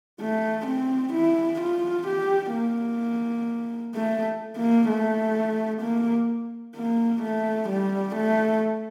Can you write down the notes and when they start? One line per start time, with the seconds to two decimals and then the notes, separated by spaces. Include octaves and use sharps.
0.21 A3
0.67 C4
1.14 E4
1.61 F4
2.08 G4
2.54 A#3
3.95 A3
4.57 A#3
4.89 A3
5.82 A#3
6.76 A#3
7.23 A3
7.70 G3
8.16 A3